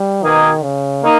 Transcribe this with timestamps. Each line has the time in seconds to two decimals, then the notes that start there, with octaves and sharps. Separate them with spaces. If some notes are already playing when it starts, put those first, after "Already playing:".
Already playing: G3
0.24 B2 D#3 A#3 D#4 G#4
0.63 C#3
1.03 D#3 A#3 D#4